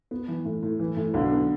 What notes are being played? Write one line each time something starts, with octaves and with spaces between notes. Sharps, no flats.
B3
E3
A2
A2
E3
A2
B1 D3
B3